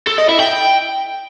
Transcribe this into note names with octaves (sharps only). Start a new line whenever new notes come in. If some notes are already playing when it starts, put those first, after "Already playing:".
A4
D#5
E4
G5